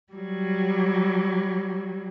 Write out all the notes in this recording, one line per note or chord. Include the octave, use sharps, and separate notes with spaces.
F#3 G3